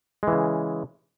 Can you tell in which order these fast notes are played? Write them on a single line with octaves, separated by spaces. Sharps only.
G#3 E3 C#3